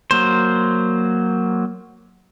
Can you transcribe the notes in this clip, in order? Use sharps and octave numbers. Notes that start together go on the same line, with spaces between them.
F#3 A#3 C5